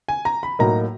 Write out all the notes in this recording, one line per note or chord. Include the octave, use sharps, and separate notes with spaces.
G#5
A#5
B5
A2 F#3 A#3 D#4 A#5